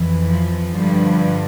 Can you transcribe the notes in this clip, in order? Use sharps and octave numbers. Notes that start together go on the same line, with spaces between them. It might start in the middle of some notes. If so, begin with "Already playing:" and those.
Already playing: F2 E3
F3
G2 D3 F3 G3